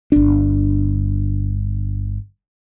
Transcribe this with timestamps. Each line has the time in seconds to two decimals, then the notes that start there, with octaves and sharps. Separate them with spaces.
0.12 G1 D4